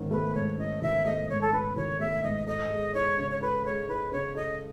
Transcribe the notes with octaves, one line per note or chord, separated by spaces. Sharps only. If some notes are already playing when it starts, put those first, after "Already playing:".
Already playing: G#2 D#3 C#4
A3 B4
G#2 C#5
C#4 D#5
D#3 E5
A3 D#5
G#2 C#5
A4
C#4 B4
D#3 C#5
A3 E5
G#2 D#5
A4 D#5
G#3
D#4 C#5
C#3
C#5
A4 B4
G#3 C#5
D#4 B4
C#3 C#5
A4 D#5